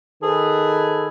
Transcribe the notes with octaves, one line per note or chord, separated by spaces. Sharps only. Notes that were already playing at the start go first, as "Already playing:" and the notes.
D#3 G#4 A4 B4